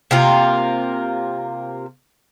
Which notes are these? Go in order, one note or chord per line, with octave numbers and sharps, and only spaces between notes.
C3 A#3 F4